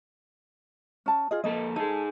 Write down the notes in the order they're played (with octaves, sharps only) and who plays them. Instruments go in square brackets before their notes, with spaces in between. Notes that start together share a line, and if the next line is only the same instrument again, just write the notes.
[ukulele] C#4 A5
F4 G#4 D#5
[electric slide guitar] F2 A#3 A4 [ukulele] D#5
[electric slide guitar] D#4 G#4 [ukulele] A4